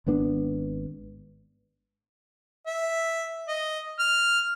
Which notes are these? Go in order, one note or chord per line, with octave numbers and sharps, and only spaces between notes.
G#1 G#3 B3 D4
E5
D#5
F6